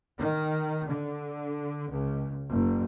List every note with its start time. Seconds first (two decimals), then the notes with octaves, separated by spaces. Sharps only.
0.18 D#3
0.87 D3
1.90 C#2
2.50 F#1